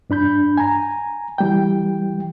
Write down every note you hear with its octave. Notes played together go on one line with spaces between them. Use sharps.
G2 D4 B5 G6
G#5 A#5
E3 G3 G5